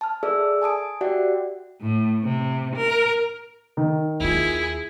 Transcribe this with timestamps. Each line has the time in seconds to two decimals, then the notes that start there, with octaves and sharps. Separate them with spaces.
0.01 A5 F6
0.23 G#4 A4 D5 E5 E6
0.62 G#5 A5 D#6 D7
1.01 F#4 G4 D5 E5 F#5 G5
1.82 A2
2.24 C3
2.75 A#4
3.77 D#3
4.20 D#2 E4 F4 G#4